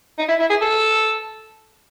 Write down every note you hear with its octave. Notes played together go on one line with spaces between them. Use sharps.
D#4
E4
E4
G#4
A4